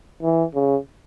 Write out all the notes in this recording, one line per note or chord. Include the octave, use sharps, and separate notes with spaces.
E3
C#3